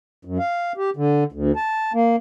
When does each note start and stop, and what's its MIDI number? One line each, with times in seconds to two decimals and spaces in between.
0.25 0.38 42
0.39 0.72 77
0.77 0.90 67
0.97 1.24 50
1.32 1.52 38
1.56 1.92 81
1.94 2.16 58